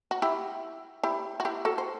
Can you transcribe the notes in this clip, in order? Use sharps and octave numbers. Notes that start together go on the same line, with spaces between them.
F#4
E4 G4
E4 G4
F#4
E4 G4
F#4 A4
C5